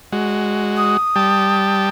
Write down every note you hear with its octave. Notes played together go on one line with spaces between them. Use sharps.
G#3 F#4
D#6
G3 G5 A5